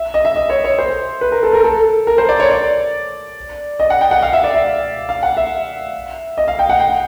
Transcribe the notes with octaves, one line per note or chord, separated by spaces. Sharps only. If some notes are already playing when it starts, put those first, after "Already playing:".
Already playing: E5
D#5
E5
D#5
C#5
C#5
C5
B4
A#4
A4
A#4
A4
A#4
C5
D5
C#5
D5
D#5
F#5
G5
F#5
F5
E5
D5
E5
F5
F#5
E5
D#5
F5
G5
F#5
G5